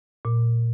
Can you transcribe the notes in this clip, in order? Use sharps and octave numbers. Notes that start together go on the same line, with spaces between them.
A#2